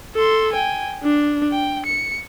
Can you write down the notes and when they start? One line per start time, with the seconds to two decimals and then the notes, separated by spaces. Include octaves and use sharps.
0.16 A4 C6
0.53 G5 G#5
1.04 D4
1.52 G5
1.86 C#7